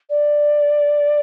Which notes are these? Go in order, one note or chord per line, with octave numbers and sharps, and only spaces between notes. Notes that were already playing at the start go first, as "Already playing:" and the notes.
D5